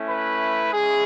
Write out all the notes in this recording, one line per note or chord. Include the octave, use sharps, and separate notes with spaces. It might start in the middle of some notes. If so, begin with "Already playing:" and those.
Already playing: A3 C#4 E4
B4
G#3 C#4 E4 G#4